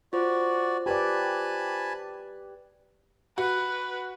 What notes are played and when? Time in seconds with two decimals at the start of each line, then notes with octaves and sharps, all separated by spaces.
0.13 F4 F#4 C5 D5
0.86 G4 B4 D5 G#5 A5 B5
3.38 F#4 B4